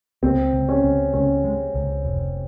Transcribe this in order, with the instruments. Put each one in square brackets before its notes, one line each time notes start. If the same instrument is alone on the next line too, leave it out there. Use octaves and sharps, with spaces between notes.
[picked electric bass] C#2 [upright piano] C4
[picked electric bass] C#2
[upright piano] C#4
[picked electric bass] C#2
[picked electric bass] C#2 [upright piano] C#4
[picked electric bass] G#3
C#2
F1